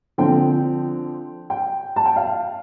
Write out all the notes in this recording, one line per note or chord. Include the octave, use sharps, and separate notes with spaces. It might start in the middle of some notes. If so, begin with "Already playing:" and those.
D3 F3 C4 G5
G5
A5
G5
F5